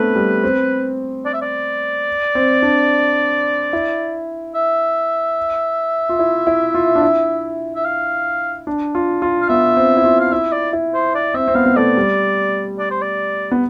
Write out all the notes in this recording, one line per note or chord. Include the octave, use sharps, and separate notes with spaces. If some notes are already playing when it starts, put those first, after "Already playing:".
Already playing: A3 B3 C4 D4 B4
G3
C4
D5
E5
D5
C4
D4
E4
E5
F4
E4
E4
F4
D4
E4
E5
F5
D4
F4
F4
F5
B3 E5
C4
E4
F4
F5
E4 E5
D5
E4
C5
D5
C4 E5
C4
B3 F5
B3
A3 D5
G3
D5
C5
D5
B3